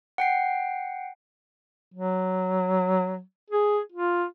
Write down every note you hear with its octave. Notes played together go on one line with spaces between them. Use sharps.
F#5 G5 C7
F#3
G#4
F4